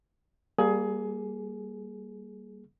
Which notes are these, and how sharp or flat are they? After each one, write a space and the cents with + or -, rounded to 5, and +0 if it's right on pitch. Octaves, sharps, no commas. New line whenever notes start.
G3 +0 A#3 +0 G#4 +25